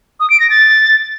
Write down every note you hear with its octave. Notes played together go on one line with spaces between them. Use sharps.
D#6
D7
A#6
A6